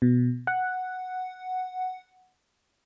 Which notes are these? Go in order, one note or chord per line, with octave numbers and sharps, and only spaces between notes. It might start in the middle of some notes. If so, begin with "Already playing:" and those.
B2
F#5